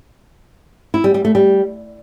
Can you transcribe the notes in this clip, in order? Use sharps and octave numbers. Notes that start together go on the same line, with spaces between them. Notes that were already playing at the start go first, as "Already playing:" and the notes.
E4
G3
G3
A3
G3